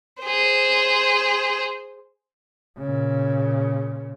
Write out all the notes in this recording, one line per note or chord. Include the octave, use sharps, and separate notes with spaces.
G#4 C5
A#2 C#3